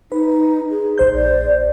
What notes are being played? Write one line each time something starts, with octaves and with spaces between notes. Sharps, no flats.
D#4 B4
G#4
A#1 C5 G6
D5